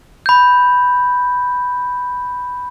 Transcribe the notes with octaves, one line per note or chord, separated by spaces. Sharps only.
B5 G6